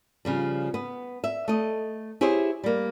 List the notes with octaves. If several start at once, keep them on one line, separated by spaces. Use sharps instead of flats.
C#3 F3 G3
B3
E5
A3 D#5
E4 G4 G#4 C5 C#5
G3 A#3